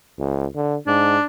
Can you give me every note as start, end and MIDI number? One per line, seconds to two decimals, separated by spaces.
0.18 0.47 37
0.55 0.76 50
0.87 1.17 44
0.87 1.26 62